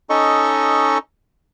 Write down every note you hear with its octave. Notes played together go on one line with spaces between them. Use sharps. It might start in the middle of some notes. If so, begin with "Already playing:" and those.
C#4 D#4 A4 D#5 C#6